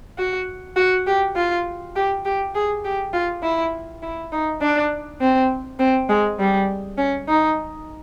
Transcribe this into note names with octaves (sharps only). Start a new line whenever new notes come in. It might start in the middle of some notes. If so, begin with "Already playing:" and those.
F#4
F#4
G4
F4
G4
G4
G#4
G4
F4
E4
E4
D#4
D4
C4
C4
G#3
G3
C#4
D#4